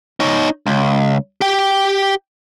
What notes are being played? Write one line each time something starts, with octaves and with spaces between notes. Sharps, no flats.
D#4 C#5
C#2
G4 G5